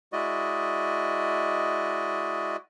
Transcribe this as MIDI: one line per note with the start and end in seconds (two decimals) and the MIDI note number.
0.13 2.57 56
0.13 2.57 64
0.13 2.57 66
0.13 2.57 74
0.13 2.57 75